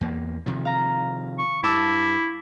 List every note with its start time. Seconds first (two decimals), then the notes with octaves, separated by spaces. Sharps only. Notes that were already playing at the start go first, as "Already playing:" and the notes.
0.01 E2 A#3
0.46 C3 D#3 F3
0.65 F5 A#5
1.39 C#6
1.63 G2 E4 A5 D6 E6